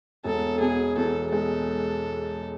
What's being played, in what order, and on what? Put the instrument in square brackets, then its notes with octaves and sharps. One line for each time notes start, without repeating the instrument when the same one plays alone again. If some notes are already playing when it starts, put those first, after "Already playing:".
[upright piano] E1 [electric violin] A4
[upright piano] B2 [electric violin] G#4
[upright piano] E2 [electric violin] A4
[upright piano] G#3 [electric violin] A4